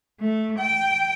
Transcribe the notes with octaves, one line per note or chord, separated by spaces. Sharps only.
A3
G5